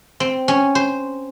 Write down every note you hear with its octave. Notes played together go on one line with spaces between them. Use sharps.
C4
C#4
C5